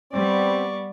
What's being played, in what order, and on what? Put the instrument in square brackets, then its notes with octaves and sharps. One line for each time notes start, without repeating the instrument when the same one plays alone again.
[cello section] G3 B3 [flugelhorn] C4 [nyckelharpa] D5 C#6